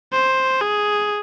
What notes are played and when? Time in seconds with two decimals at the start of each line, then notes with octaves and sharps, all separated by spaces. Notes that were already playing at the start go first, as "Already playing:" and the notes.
0.13 C5
0.61 G#4